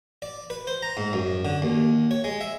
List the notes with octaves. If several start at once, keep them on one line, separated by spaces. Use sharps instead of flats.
D5
B4
C5
A#5
G#2
F#2
D3
D#2
C#5
G#3
E5